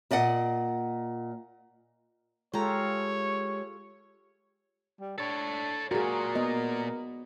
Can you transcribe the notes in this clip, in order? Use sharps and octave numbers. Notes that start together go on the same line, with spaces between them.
A#2 D5 D#5 F#5
G#3 F4 G4 A4 C#5 A#5
G3
D4 A4 C#5
A#2 F#4 G#4 A#4
B3 D#5